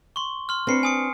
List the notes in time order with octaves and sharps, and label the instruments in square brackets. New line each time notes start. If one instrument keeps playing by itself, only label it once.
[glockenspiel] C6 C#6
C6 F6
[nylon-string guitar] C4 D4 B4 [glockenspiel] F6 C7 C#7
[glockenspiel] G#5 D#6 C#7